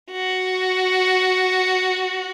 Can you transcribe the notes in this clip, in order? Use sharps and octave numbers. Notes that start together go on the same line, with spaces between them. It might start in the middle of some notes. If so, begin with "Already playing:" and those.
F#4